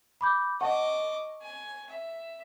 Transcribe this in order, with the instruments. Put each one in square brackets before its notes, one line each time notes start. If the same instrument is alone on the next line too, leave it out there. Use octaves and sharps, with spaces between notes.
[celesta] B5 D6 G6
[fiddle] D#5 D6 [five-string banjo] F#5 A5 [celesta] C#6
[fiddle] G#5
E5